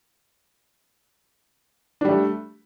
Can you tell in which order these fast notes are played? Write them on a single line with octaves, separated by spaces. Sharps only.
D4 G3 A3